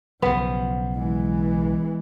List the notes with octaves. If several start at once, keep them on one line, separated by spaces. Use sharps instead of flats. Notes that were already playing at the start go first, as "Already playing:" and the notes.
B1 C#3 F3 B3
E3 G#3